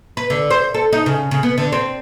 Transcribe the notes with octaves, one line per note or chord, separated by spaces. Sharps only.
B4
D3
C5
A4
D#4
C#3
C#3
B3
D3
C4